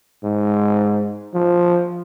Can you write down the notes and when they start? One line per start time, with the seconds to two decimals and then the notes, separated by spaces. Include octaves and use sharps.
0.23 G#2
1.34 F3